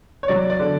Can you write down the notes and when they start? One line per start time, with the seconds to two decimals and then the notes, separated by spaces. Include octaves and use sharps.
0.23 C#5
0.28 F#3 D5
0.50 D5
0.60 D3